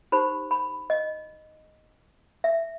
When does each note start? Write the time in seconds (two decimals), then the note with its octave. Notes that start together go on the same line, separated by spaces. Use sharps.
0.12 D#4 G4 C5 B5
0.51 B5
0.90 D#5
2.44 E5